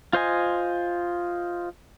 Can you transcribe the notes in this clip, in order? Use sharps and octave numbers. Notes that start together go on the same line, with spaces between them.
F4 C5 D#5 G#5